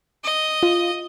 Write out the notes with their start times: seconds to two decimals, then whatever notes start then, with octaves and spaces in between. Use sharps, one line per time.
0.24 D#5
0.63 F4